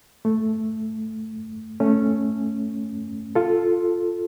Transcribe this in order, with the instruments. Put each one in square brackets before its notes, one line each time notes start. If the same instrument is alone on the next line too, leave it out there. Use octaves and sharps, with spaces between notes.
[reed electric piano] A3
A3 C#4
F4 A4